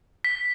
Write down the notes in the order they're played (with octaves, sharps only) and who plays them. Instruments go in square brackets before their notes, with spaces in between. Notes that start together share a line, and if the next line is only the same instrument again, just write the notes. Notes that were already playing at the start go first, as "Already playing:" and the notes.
[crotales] B6